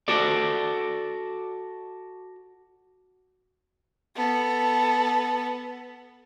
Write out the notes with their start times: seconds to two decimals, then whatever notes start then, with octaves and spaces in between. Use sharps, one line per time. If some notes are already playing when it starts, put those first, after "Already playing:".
0.08 F#4 A4 D5
4.16 B3 A4